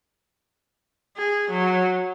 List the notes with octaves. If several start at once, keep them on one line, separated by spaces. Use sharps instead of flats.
G#4
F#3